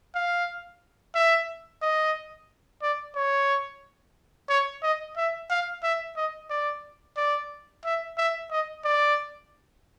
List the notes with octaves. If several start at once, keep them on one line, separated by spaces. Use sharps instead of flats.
F5
E5
D#5
D5
C#5
C#5
D#5
E5
F5
E5
D#5
D5
D5
E5
E5
D#5
D5